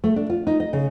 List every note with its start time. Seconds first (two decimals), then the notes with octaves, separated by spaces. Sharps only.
0.04 A3
0.16 D4
0.30 F4
0.47 D#4
0.60 D#5
0.73 C#3